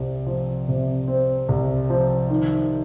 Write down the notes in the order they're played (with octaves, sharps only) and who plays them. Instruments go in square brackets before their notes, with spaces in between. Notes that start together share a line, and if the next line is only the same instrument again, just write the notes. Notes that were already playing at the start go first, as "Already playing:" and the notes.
Already playing: [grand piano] C2 C4
F3
C3
C4
C2
F3
D#3